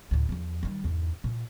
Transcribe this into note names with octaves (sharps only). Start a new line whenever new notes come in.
D2 A2
E2 F3
D#3 G3
E2 G#2
A#2